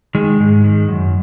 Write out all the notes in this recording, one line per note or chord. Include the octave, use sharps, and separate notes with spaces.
D#3 G#3
G#2
D#3
F#2